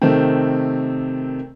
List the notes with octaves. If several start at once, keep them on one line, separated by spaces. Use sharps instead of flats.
C3 D#3 A3 C4